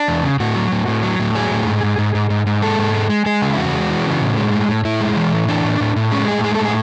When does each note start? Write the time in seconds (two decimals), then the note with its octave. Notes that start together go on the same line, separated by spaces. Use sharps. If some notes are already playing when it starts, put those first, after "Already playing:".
Already playing: D4
0.08 E2
0.23 C#3
0.40 A2 F#4
0.56 F#3
0.72 A2
0.88 A2
1.03 F#3
1.20 A2
1.35 F#3 G#4
1.51 A2
1.67 G#2
1.83 G#2
1.98 G#2
2.15 G#2
2.30 G#2
2.47 G#2
2.62 G#3 A4
2.78 G#2
2.94 G#3
3.10 G#3
3.26 G#3 G#4
3.42 C#3
3.53 E4
3.57 E2 F#4
3.74 G#3
3.90 E3
4.06 C#3
4.21 A2
4.37 G#3
4.53 A2
4.69 A2
4.85 A2 E4
5.01 G#3
5.16 E3
5.32 A2
5.48 E3 D4
5.64 A2
5.80 A2
5.96 A2
6.11 G#3 C#4
6.28 A2 G#4
6.44 G#3 G#4
6.55 A4
6.60 A2 G#4